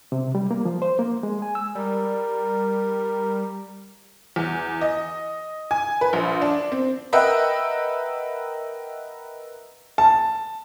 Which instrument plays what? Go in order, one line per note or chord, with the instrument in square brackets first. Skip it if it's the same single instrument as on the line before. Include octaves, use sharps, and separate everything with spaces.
[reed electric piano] C3
G3
A#3
F3
C5
A#3
G#3
G#5
E6
[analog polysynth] G3 [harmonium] A#4
[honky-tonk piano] E2
D#5
G#5
B4
A#1
D4
C4
A#4 B4 D#5 E5 F#5 G5
[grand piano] A5